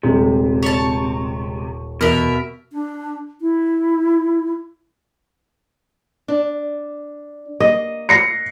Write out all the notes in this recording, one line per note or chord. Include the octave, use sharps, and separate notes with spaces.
D#1 C3 G#3
C#5 A5
E2 B2 A#4 E5
D4
E4
D4
A#3 D#5
A#6 C7 C#7